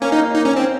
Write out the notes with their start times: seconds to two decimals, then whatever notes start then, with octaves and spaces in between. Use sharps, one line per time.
0.01 A#3 C#4
0.12 D#4
0.34 D#4
0.45 C#4
0.56 C4